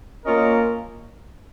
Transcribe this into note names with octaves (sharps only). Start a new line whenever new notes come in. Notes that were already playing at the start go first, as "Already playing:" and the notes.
A#3 C#4 F4 A#4 D#5